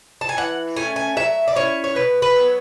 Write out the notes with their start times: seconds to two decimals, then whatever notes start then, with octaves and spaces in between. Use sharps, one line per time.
0.21 A5
0.29 G#5
0.37 E3 F#5
0.76 A3 C#4 G#5
0.96 G#5
1.16 F#3 E5
1.48 D5
1.56 C#4 E4 C#5
1.84 C#5
1.96 B2 B4
2.22 B4
2.36 F#3 B3